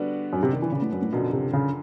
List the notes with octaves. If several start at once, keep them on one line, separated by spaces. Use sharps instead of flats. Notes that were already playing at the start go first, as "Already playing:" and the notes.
Already playing: D3 G3 B3 D4 F#4
F#2
C3
D#3
E3
C#3
A2
F#2
A2
F#2 B2 D3 F3
C3
C#3